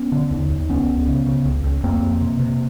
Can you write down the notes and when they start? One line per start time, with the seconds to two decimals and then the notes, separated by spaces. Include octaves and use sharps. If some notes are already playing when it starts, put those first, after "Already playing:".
Already playing: B3 C#4
0.12 D3
0.31 D#2
0.50 D#2
0.69 C#2 B3 C#4
0.89 C#2
1.08 C#3
1.26 C#3
1.45 C#2
1.64 C#2
1.84 F2 A#3 C4
2.03 F2
2.21 C3
2.40 C3